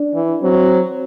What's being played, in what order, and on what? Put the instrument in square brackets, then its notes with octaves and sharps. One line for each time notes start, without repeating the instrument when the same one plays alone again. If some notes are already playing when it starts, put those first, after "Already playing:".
Already playing: [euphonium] D4
[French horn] E3
[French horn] F#3 [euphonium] C4